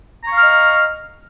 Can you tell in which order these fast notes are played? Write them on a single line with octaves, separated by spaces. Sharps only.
A#5 C#6 F5 F6 D#5